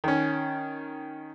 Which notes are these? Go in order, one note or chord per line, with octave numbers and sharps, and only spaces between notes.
D#3 C#4